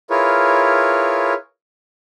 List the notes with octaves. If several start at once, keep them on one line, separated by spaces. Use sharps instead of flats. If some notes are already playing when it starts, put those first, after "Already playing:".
E4 F4 G#4 A#4 B4 C#5